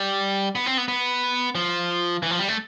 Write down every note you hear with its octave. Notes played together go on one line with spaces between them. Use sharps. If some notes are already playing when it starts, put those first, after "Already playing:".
Already playing: G3
B3
C4
B3
B3
F3
E3
F3
G3
A3